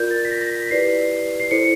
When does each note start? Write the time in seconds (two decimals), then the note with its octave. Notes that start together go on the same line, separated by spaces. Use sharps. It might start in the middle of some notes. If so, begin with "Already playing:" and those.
Already playing: F4 A#4 D5 G6
0.11 A6
0.25 B6
0.31 A#6
0.41 A#6
0.51 B6
0.66 B6
0.71 E4 G4 B4 D5 C7
1.40 C7
1.51 E4 A4 C5 C#7